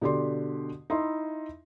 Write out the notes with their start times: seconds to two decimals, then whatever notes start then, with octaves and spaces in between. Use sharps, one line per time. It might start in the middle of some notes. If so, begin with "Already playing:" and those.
0.01 B2 D3 G4 D5 C6
0.90 D#4 E4 E5 C6